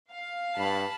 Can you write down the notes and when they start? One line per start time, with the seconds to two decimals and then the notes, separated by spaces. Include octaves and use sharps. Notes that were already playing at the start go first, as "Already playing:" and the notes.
0.11 F5
0.57 G2 A5 B5